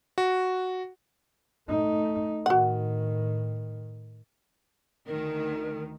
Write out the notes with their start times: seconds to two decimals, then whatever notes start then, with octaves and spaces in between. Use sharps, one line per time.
0.18 F#4
1.69 A3 D#4
2.46 A2 D#3 F#4 F#5
5.07 D2 D#3 A#4